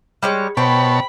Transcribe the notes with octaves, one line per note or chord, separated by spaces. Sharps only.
G3 G#3 C#5
B2 C5 C#5 G5 A5 B5